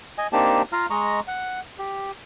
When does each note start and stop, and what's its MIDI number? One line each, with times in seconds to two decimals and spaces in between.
0.18 0.27 75
0.18 0.27 80
0.33 0.62 58
0.33 0.62 60
0.33 0.62 62
0.33 0.62 63
0.33 0.62 67
0.33 0.62 81
0.73 0.86 65
0.73 0.86 77
0.73 0.86 82
0.73 0.86 89
0.90 1.20 56
0.90 1.20 75
0.90 1.20 82
0.90 1.20 85
1.28 1.60 78
1.79 2.11 67